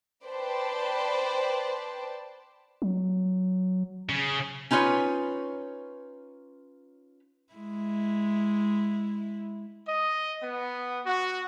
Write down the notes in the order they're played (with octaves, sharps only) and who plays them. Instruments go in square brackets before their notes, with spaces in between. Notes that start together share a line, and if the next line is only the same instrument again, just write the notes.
[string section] B4 C5 D5 G5 A5
[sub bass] F#3
[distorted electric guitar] C#3
[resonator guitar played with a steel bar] C#4 D#4 F4 B4 C#5
[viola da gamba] G#3 E4
[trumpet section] D#5
B3
F#4